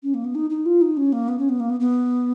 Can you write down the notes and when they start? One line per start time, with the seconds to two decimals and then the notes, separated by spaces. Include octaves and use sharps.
0.03 C#4
0.14 A#3
0.24 B3
0.35 D#4
0.50 D#4
0.66 F4
0.81 D#4
0.97 C#4
1.12 A#3
1.28 B3
1.39 C#4
1.49 B3
1.60 A#3
1.69 B3
1.80 B3